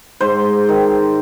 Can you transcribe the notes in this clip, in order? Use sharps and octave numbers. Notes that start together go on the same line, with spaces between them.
G#2 C5
D#3